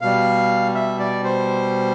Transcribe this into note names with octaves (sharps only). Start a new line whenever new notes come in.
B2 G3 F5
E5
D5
C5